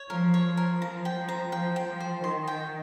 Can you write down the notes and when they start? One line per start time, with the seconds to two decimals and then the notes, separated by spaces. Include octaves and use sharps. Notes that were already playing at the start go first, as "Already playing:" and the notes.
Already playing: C#5
0.10 F3 A#4
0.34 C#5
0.46 F3
0.57 A#4
0.82 F3 A#5
1.05 G5
1.17 F3
1.29 A#5
1.52 F3 G5
1.76 G5
1.88 F3
2.01 C5
2.24 D#3 C6
2.48 G5